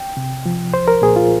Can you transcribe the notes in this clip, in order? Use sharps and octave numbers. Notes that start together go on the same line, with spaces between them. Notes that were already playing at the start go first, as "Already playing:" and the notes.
Already playing: G5
C3
F3
C2 C5
A#4
A#2 G#4
F4